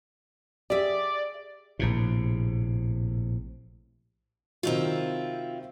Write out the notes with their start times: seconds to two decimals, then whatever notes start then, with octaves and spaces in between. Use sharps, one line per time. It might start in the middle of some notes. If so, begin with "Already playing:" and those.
0.70 G4 G#4 D5 E5
1.79 A#1 A2 C3
4.63 C3 D#3 F#3 C4 E4 F4